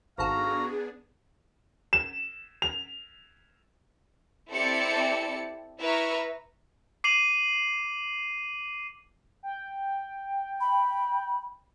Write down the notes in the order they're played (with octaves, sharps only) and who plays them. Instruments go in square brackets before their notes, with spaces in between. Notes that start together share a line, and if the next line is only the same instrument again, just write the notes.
[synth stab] G#1 A4 [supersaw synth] B3 D4 G#4 [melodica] F#4 A#5 [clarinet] F5
[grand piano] E7
F7
[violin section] C4 E4 G4 A4 D5 C#7
E4 B4 E5 A#5 C#6 F6
[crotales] D6 C7 D#7 F7 F#7
[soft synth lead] G5
[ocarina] B5